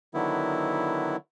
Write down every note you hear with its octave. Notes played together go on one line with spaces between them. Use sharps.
D3 D#3 F#3 B3 E4